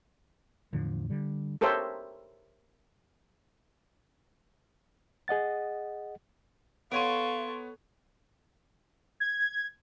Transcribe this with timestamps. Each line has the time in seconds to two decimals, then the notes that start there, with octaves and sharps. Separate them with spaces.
0.73 E2 A2 D3 F3
1.10 D3 G3
1.61 G4 A4 A#4 C5 C#5 E5
5.28 G#4 D#5 F#5 A6
6.92 B3 A4 C#5 F5 C6 C#6 D7 D#7
9.20 G#6